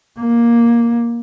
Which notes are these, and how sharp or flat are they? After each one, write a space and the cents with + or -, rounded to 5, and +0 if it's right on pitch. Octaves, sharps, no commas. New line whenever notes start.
A#3 +10